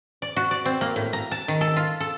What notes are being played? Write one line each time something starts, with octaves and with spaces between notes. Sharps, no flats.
D5
F#4
D5
C4
A#3
A2
A#5
A5
D#3
A4
F4
A4